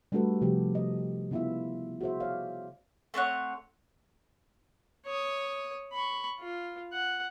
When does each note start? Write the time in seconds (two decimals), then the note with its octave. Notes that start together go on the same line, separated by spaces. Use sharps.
0.12 G3 A3 D4 F#4 A4 B4
0.41 C3 F3 F#4 G4
0.75 D#5
1.31 C#3 B3 E4 F4 E5
2.01 F#4 G#4 C5 E5
2.20 C#5 D5 F5
3.14 A3 C4 C#5 F#5
5.06 C#5 D#6
5.93 B5 C#6
6.39 F4
6.93 F#5